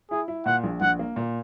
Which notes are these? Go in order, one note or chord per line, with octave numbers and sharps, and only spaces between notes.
E4 G#4
E4
A#2 F#5
A#1
A#1 F#5
A#3
A#2